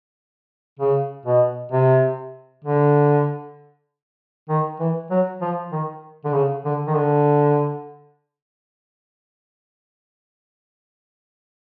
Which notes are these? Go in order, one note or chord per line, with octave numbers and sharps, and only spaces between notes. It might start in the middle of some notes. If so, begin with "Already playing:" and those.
C#3
B2
C3
D3
D#3
E3
F#3
F3
D#3
D3
C#3
D3
D#3
D3